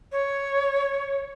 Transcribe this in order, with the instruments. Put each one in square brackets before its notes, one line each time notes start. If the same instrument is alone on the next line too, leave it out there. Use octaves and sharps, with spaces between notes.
[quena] C#5